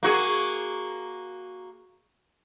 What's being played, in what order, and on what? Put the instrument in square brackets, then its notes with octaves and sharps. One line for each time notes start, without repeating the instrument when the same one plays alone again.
[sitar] A#3 F#4 G#4